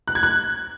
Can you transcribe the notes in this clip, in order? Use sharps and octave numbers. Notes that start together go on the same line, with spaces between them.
F#6
G#6
F#6